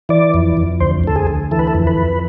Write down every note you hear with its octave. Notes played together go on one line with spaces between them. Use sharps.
E3 D5
F2
F2
D2 C5
D2 A4
G#4
D2
E3 A4
B4
A4
F2
B4
F2